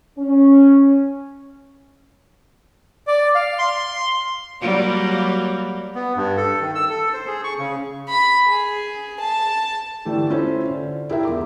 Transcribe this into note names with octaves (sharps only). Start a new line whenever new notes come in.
C#4
D5
F5
C6
F#3 G3 A#3
B3
G2
A4
D#3
E6
A4
C5
G#4
C#6
C#3
B5
G#4
A5
D3 E3 A3 G4 A4
C#4 E4 F4 A4 C5
D3
E4 G4 G#4 A#4 E5
E2 F4 D6